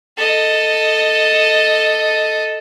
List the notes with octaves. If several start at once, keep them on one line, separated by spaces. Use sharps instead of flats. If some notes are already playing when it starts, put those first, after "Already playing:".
A4 D#5